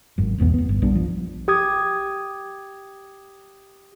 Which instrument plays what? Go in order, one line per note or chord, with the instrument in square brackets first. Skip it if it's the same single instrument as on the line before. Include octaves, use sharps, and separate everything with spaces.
[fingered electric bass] G#1 F#2
E1 B1 E2 B3
F1 B3
G1
A#1 G3 B3 D4
F3
[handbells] G4 D#6 G#6